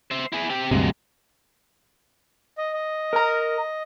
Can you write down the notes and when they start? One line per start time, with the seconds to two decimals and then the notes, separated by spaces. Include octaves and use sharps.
0.11 C5 E5
0.33 E4 G#4
0.49 C4 G4
0.71 D2 G2 C3 F#3 G#3
2.58 D#5
2.73 D#5
3.13 A#4 A#5